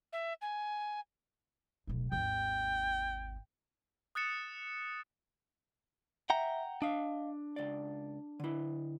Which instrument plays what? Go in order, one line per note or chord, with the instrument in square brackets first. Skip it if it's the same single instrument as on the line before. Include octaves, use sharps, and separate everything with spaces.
[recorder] E5
G#5
[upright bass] D1 B1
[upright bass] G#1 D#2 [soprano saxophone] G5
[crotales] D#6 F#6 A6 C#7 E7
[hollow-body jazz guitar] E5 [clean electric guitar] F#5 G5 A#5
[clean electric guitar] D4 [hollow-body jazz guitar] D#5 F5
[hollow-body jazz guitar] C#2 D5
D3 E4